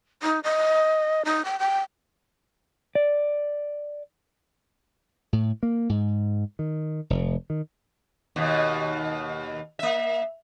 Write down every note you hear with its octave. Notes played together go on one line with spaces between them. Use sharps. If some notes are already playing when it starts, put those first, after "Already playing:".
D#4
D#5
D#4
G5
G5
D5
A2
A#3
G#2
D#3
F1
D#3
D#2 B2
A#3 E5